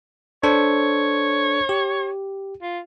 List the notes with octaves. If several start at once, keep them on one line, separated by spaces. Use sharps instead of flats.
D4 A4 C5 C#5
G4
F4